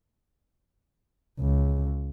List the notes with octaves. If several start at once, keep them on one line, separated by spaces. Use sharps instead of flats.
C#2